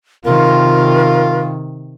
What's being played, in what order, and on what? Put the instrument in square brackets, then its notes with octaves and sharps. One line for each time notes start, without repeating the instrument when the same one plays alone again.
[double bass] C3 D#3 [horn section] F4 [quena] A#4